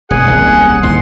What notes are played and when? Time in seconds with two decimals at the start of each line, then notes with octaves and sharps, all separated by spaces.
0.10 E1 C#3 G#4 F#5
0.27 D#1 C2 C#3 G#5
0.83 G1 D#2 A2 C6